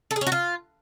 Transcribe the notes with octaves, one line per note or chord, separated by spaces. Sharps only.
A4
G#4
C#4
F#4
F4